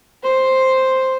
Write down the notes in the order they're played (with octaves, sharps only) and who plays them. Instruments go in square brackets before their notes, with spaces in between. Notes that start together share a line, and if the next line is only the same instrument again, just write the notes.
[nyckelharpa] C5